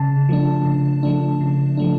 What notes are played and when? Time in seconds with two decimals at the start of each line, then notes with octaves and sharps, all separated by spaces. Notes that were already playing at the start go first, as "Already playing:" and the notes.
Already playing: C#3 A5
0.29 F3 A3 D4
0.66 C#3
1.03 F3 A3 D4
1.41 C#3
1.77 F3 A3 D4